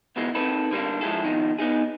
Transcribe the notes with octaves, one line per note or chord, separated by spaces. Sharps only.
D2 G#2 B2 E3 G#3
D#2 D#3 C4 A4 B4
D3 G3 A#3 D4
F3 G#3 A3 E4 G#4 A4
B2 D#3 F3 D#4
B3 D#4 G#4